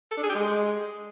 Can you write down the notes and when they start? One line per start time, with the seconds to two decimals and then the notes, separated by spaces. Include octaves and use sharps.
0.12 A4
0.17 D4
0.23 G#4
0.29 G4
0.35 G#3